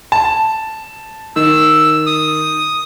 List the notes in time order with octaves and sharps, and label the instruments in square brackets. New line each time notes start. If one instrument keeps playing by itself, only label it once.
[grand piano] A5
[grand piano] D#3 [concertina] E6
[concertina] D#6